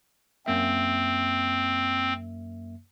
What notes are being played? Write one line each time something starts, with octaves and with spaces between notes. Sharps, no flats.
F#2 A#3 C4 E5